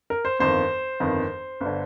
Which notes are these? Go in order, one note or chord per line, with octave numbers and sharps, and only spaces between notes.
A#4
C5
G1 F2 D#3 C5
G1 F2 D#3
G1
D3